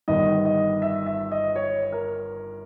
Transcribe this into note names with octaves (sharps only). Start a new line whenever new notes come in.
G1 G2 D#3 D#5
D#5
E5
E5
D#5
C#5
A#4